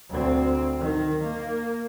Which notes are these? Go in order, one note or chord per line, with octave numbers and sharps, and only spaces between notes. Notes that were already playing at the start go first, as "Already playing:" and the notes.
D2 C4
D#3
A#3